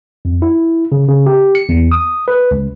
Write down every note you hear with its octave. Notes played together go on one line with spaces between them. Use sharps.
F2
E4
C#3
C#3
G4
C#7
E2
D#6
B4
C#2